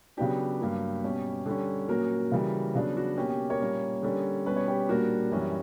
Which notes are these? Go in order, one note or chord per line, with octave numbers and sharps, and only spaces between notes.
C#3 F#3 B3 D4 G4
G2 F#3 A#3
B2 G3 C#4
D3 G3 C#4
A#2 F#3 A#3 C#4 F#4 A#4
C#3 E3 G3
C#3 F#3 B3 D4
F#4
B2 A#3 C#4 G4
G4
A#4 C#5
A#2 G3 A#3 C#4
D3 G3 C#4
B2 G3 C#4 B4
C#5
G4 B4
A#2 G3 A#3 D4 F#4 A#4
F#2 E3 G3 C#4